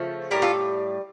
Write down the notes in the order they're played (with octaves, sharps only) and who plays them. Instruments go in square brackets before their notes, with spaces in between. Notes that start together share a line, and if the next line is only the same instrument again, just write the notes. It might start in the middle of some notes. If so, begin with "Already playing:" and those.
Already playing: [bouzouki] C#3 F3 A3
A2 G3 G4 A#4
F4 A4